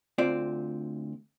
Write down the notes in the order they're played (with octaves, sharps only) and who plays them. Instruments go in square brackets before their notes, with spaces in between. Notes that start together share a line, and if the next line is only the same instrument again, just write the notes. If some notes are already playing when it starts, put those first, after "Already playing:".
[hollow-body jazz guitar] D2 C4 F4 D5